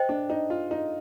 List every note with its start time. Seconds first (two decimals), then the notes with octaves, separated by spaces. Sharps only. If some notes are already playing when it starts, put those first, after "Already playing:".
Already playing: C5 D#5 G5
0.09 D4
0.30 D#4
0.50 F4
0.71 D#4